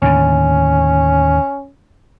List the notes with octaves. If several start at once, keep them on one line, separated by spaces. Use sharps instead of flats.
D#2 A2 D3 C#4